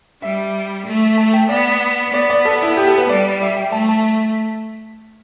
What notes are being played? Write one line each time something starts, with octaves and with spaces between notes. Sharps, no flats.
G3 E5
A3
A5
G5
B3 D5
B3 D5
D5
A4
E4
G4
A4
B4
G3 D5
E5
G5
A3 A5
A5